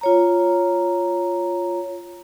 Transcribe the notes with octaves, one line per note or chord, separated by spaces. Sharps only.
F4 C#5 A#5